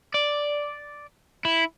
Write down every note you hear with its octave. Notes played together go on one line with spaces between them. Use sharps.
D5
E4